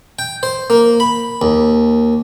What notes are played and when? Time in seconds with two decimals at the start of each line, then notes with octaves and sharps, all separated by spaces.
0.19 G5
0.43 C5
0.70 A#3
1.00 B5
1.42 D#2